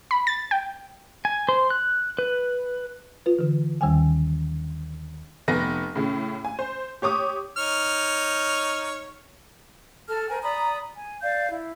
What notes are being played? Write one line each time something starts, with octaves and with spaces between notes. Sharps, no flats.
B5
A6
G5
G#5
C5
F#6
B4
F4 B4
D3 E3
D#2 D#3 G3 G5 G#5
F1 B3 A#6
A2 C#3
G#5
C5
G4 C#5 D6 D#6
D#4 C#5 F6
A4 A5 F6
A#4 C5 G5 G#5
D5 A#5 B5 D#6
G#5
D5 F5 G6
E4